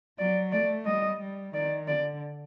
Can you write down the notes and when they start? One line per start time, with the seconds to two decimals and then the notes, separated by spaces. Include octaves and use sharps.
0.19 F#3 D5
0.52 A3 D5
0.86 G3 D#5
1.20 G3
1.54 D#3 D5
1.88 D3 D5